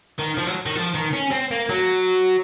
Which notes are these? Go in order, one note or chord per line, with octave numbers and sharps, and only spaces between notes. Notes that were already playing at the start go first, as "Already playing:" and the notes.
D#3
F3
F#3
D#3
F3
D#3
C#4
C4
A#3
F#3